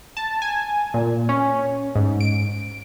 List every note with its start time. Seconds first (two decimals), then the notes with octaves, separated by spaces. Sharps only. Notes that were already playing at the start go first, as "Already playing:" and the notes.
0.17 A5
0.42 G#5
0.94 A#2
1.29 C#4
1.95 G#2
2.21 D7